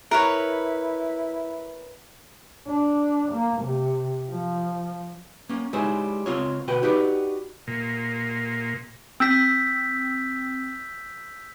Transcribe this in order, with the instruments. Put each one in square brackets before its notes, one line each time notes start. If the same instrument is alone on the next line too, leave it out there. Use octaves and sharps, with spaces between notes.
[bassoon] E4 [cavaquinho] A#4 B4 C#5
[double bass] D4
A#3
C3
F3
[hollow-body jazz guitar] A#3 C#4
G3 G#3 D#4 E4 C5 C#5
C#2 C4 F4 C#5
D2 B2 F#4 B4 G5
D#4 F#4 G4 B4 D5
[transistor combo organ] A#2
[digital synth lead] C4 [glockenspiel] E6 G6 B6